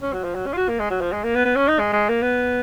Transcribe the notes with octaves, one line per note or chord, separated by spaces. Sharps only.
C#4
F#3
F3
F#3
C#4
F4
F#4
A#3
G#3
F#3
F3
G#3
A#3
B3
B3
C#4
D#4
G#3
G#3
A#3
B3